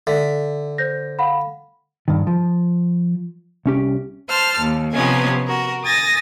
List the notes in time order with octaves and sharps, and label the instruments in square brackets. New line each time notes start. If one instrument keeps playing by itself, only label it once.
[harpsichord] D3 [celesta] E5 B6
[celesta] C5 G6 A#6
F5 F#5 B5
[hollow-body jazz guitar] G2 D#3
F3
C2 C#4 G4
[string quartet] C5 A5 F6
D#2
C3 F3 B3 C#4 D#5 G#5
F#4 A#4
G#5 D#6 A6 A#6